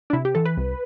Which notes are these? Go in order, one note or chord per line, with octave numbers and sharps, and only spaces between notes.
D4
C3 E4
G4
E3 A4
B4
C2